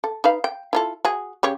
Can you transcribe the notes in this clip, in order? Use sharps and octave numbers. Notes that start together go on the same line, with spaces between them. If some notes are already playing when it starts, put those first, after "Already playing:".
A4
D#4 B4 F5
G5
E4 F4 A4
F#4 G#4
C#3 G4 C#5